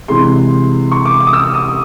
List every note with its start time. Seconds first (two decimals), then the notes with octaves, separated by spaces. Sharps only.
0.08 C3 E3 G#3 C6
0.91 C#6
1.05 D6
1.20 D6
1.27 D#6
1.33 E6
1.54 D#6